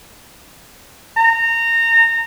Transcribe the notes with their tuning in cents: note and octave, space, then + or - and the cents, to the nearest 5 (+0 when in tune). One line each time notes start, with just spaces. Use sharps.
A#5 -25